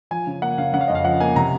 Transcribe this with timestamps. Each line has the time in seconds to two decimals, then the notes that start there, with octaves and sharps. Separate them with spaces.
0.11 F3 G#5
0.27 C#3
0.42 A#3 F#5
0.58 C#3 F5
0.73 C#3 F#5
0.81 F5
0.88 F2 D#5
0.95 F5
1.05 F3 F#5
1.20 A#3 G#5
1.36 C3 A#5